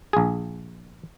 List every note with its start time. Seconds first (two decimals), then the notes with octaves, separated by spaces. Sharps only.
0.13 A#1 G#4